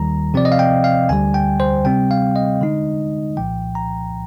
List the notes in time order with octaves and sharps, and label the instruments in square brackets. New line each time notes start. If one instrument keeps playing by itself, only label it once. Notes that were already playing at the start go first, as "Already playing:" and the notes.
Already playing: [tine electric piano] D#2 D#3 G3 A#5
C3 F3 C4 D5
D#5
F5
G5
F5
D2 D3 G3 G#5
G5
C5
C3 G3 C4 G5
F5
D#5
D3 G#3 D#4
C2 A#2 F3 G5
A#5